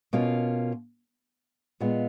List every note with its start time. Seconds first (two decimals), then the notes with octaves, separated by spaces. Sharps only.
0.13 B2 A#3 C#4 F4
1.80 A#2 G#3 B3 F4